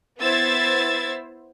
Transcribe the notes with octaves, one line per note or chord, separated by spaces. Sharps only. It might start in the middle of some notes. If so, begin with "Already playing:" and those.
B3 E4 C5 E6 G#6 A6